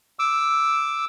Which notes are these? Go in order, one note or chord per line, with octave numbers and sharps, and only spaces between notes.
D6 E6